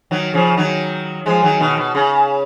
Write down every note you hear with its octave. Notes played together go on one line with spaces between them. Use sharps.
D#3 F#3
C#3 F3
D#3 F#3
F3 G#3
D#3 F#3
B2 D#3
B2
C#3